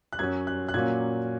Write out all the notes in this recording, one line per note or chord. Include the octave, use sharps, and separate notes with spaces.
F#6
F#2 F#3 C#4 G#6
F#6
F#6
A#2 F#3 A#3 C#4 G#6